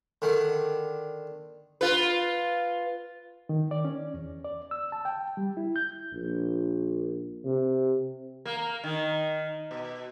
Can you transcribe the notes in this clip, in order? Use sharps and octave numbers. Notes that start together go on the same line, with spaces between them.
D3 D#3
F4 B4
D#3
D5
C#4
E2
D5
E6
A5
G5
G3
E4
G6
A#1
C3
A#3
A#3
D#3
B2